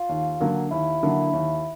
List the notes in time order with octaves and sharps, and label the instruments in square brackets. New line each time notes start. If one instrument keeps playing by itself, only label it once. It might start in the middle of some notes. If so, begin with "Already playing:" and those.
Already playing: [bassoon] F4
[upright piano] D#2
D3 F#3 A#3
[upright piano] D#2 [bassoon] E4
[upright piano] D3 F#3 A#3
D#2